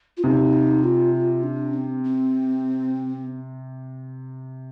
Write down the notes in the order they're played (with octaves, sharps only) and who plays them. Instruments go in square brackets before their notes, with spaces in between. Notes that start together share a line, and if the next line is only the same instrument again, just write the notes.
[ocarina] F4
[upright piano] C3 [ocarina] D#4
[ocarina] F4
D4
C4
C4